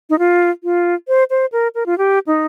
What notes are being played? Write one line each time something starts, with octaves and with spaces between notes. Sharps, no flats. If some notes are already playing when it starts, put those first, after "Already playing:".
D#4
F4
F4
C5
C5
A#4
A#4
F4
G4
D#4